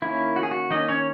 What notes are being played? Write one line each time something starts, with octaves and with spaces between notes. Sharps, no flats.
D#3 A#3 C#4 E4
F#4
G#4
F#4
D#3 A#3 C#4 D#4 D#5
C#4 C#5